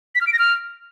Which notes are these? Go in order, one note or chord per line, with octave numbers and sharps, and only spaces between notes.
B6
F6
D7
A#6
F6